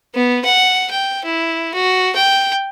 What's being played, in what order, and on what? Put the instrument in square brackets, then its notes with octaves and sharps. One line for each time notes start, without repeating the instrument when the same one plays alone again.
[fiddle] B3
F#5
G5
E4
F#4
G5